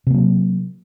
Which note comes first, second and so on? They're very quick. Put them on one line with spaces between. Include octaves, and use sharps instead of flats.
C3 A#3 F#3